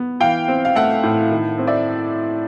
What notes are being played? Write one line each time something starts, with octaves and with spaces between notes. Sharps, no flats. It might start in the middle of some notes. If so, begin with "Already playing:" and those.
Already playing: B3
E3 F5 G5
C4
F5
A3 E5 F#5
A2
D#3
C4
D5 E5